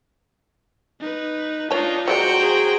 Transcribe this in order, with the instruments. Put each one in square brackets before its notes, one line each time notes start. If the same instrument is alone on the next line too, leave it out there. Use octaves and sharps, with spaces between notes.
[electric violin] D#4 B4
[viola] D4 D#4 [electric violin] F4 A#5 [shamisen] C#5 A5
[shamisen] F#3 G#3 D5 [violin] F#4 G5 [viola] C5 A#5 [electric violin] C#7
[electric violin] G#4